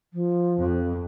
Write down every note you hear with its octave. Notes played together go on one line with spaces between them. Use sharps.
F3
F2